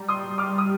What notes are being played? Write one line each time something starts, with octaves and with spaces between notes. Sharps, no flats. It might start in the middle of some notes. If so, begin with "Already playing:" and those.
Already playing: G3 A#5
C6 D#6
D6 F6
D#6